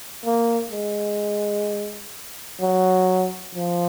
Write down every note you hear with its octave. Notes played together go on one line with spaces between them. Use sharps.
A#3
G#3
F#3
F3